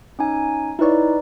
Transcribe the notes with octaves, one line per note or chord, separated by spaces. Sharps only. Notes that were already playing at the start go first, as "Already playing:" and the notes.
C#4 D#4 G#5
D#4 E4 B4 C#5 D5